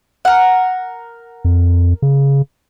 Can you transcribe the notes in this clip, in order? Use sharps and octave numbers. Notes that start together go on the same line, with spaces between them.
A#4 F#5
F2
C#3